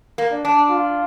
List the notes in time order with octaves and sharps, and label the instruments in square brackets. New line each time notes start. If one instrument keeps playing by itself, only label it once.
[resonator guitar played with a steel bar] A#3
[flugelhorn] D4
[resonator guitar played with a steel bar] D4
[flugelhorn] F4